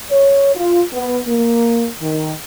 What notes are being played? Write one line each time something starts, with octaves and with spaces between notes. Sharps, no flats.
C#5
F4
B3
A#3
D#3